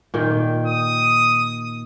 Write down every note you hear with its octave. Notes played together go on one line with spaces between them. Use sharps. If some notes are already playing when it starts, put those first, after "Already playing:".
A#2 D#3 G5
D#6